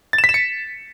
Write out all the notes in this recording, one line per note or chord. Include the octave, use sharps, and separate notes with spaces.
A6
E7
B6
E7
C#7